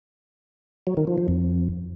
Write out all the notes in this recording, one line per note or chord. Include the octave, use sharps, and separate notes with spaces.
F#3
D#3
F3
F3
F2